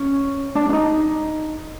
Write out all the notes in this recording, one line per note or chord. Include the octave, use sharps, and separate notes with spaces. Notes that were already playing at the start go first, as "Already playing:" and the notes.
Already playing: C#4
D4
D4
D#4